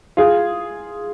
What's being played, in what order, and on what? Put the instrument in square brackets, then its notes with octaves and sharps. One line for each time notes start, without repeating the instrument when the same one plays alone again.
[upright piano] F4 G#4